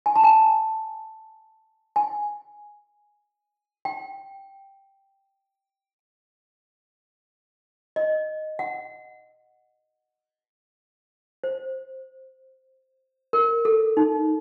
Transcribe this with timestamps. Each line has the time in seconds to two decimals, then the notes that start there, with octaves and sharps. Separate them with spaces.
0.06 G#5
0.16 A5
0.24 G#5
1.96 G#5
3.85 G5
7.96 D#5
8.59 F#5
11.44 C5
13.33 A#4
13.65 A4
13.97 D#4